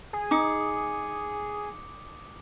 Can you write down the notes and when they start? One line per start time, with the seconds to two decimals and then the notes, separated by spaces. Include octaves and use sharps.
0.13 G#4
0.31 D#4 D6 D#6 C#7